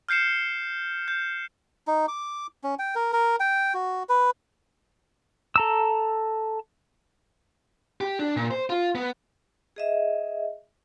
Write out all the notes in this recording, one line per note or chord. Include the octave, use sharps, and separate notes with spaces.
F6 G6 C7 C#7 E7
G6
D#4
D6
C#4
G5
A#4
A#4
G5
F#4
B4
A4 A#5 E6
G4
D4
A#2
C5
F4
B3
G#4 D#5 E5